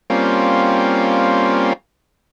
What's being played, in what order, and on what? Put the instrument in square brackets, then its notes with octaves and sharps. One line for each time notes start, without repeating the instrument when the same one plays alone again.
[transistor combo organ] G3 A#3 C4 C#4 F4